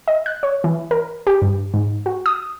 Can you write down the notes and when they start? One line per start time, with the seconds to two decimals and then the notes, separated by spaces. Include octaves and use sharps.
0.08 D#5
0.26 F#6
0.43 C#5
0.64 E3
0.91 A#4
1.27 G4
1.42 G2
1.74 G#2
2.06 F#4
2.26 D#6